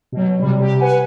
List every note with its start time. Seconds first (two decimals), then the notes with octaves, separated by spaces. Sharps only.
0.12 B2 F#3
0.39 C3 G3
0.58 C3 G4
0.80 B4 F#5 G#5